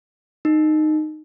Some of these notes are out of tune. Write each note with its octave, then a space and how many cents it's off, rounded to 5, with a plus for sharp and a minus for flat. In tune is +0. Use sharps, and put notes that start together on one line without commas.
D#4 -15